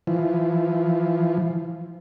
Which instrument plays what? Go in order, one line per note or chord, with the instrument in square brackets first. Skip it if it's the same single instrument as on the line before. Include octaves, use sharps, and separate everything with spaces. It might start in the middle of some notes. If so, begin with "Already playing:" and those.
[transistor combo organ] E3 F3